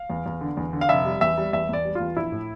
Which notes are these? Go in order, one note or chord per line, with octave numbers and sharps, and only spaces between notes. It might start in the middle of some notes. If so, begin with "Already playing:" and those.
Already playing: F5
E2
E2
D3
E2
D3
F5
F1 E5
G3
E2 E5
G3
E2 E5
E2 D5
G3
E2 F4
A#1 E4
A2